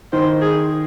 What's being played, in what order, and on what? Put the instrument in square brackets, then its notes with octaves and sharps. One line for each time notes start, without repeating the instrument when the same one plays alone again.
[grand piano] D#3 [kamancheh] C5
[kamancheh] G#4